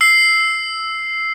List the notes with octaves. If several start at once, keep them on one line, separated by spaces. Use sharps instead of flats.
E6 C7